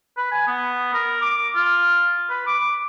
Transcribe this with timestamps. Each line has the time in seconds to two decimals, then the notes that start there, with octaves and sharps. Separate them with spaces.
0.17 B4
0.31 G#5
0.47 B3
0.94 A#4
1.21 D6
1.55 F4
2.29 B4
2.47 D6